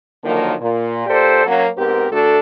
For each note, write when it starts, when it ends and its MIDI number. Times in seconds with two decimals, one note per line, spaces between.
0.23 0.53 50
0.23 0.53 51
0.23 0.53 53
0.23 0.53 54
0.23 0.53 58
0.59 1.04 46
1.07 1.43 46
1.07 1.43 67
1.07 1.43 69
1.07 1.43 72
1.07 1.43 74
1.46 1.68 54
1.46 1.68 58
1.46 1.68 61
1.76 2.06 44
1.76 2.06 59
1.76 2.06 60
1.76 2.06 67
1.76 2.06 70
2.11 2.40 38
2.11 2.40 57
2.11 2.40 62
2.11 2.40 66
2.11 2.40 69